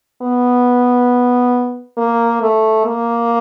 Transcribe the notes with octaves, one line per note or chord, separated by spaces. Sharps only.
B3
A#3
A3
A#3